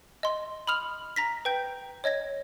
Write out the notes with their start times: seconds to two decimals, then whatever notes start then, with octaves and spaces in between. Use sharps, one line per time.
0.23 D#5 C6
0.67 B5 D#6 F6 F7
1.16 A#5 A#6 B6
1.45 B4 G5 G6
2.04 C#5 D#5 G#6 A#6